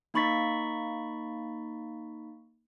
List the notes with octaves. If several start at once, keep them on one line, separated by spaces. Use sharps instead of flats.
A#3 D#4 B5 C#6 A6 B6